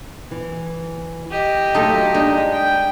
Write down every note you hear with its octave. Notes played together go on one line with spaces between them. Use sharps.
E3
G4 D#5
F#3 A3 D#4 F4 A4
G#3 D4 D#4
G5